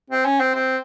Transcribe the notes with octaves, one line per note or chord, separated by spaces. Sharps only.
C4
C#4
C4
C4